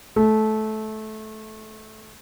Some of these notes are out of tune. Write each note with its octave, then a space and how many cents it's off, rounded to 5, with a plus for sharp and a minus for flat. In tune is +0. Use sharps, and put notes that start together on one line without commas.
A3 -20